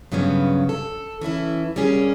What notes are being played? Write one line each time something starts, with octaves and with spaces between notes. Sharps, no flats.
G2 C#3 F#3 B3 C#4
A4
E3 C#4 E4 A4
G3 A#3 C#4 G#4